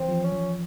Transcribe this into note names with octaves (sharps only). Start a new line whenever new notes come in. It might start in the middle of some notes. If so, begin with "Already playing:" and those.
Already playing: E3 C4
F3
C#4
F3